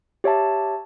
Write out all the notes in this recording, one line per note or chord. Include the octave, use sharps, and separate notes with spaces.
G4 C#5 E5 A5